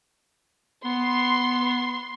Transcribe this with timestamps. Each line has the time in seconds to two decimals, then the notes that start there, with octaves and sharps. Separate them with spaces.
0.85 B3 C6